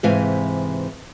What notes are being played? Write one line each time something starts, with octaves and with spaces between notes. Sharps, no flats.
G#2 C3 E3 F5 G#5